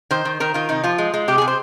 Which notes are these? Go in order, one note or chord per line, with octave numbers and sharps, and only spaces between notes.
D#3 C5
D#3
D#3 A#4
D#3 F4
C3 D#4
F3 F4
G#3
G#3
C3 G4
C3 G#4
C5